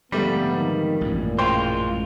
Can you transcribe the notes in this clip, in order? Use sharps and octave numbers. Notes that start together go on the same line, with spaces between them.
F2 G#2 D3 G3 A3 B3
D#3
A1 F#2 A#2
G#3 F4 C5 G5